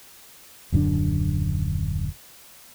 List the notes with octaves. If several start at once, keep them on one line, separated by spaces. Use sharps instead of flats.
D#1 F#2 D3 D4